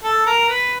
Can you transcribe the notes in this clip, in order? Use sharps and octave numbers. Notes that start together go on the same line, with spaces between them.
A4
A#4
B4